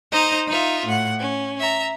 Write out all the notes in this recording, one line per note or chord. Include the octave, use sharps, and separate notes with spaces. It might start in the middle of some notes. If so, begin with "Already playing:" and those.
D#4 C5 D#5 A#5
D#4 F4 E5
A2 F#5
C#4
E5 A#5